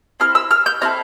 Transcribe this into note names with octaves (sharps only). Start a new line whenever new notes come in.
C4 E4 F6
E6
F6
G6
C4 E4 A4 F6